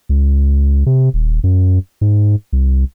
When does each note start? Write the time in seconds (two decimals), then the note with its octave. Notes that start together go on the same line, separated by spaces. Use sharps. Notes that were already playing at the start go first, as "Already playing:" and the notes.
0.09 C#2
0.86 C3
1.14 D#1
1.44 F#2
2.01 G#2
2.53 C2